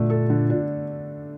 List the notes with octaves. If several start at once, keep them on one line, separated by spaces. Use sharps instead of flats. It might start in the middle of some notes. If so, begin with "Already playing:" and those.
Already playing: A#2 D3 A3 D4
A4
D3
D4